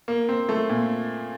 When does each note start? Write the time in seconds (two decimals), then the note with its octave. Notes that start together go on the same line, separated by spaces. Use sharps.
0.08 A#3
0.29 C4
0.49 A3
0.69 A#2